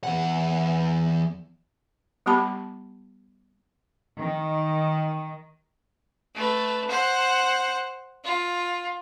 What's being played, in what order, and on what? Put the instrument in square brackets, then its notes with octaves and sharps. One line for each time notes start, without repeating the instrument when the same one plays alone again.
[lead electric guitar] E2 F#5
[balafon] G3 B3 G4 A5 B5
[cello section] D#3
[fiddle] A3 B4
C5 F#5
F4